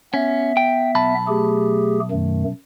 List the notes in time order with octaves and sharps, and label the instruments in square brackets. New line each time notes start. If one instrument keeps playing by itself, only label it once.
[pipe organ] B3 E5 [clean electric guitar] C#4
[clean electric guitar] G5
B1 A5 B5
[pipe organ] A3 G4 G#4
F#2 D#3 A3